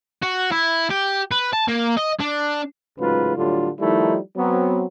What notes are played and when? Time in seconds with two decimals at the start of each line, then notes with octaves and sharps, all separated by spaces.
0.23 F#4
0.52 E4
0.90 G4
1.31 B4
1.53 A5
1.68 A#3
1.97 D#5
2.20 D4
2.99 A1 G#2 C#3 F#3 F4 B4
3.36 A2 D3 F#3 G3 D4 F4
3.80 D#3 F3 G3 A3 D#4 E4
4.37 F#3 B3 C4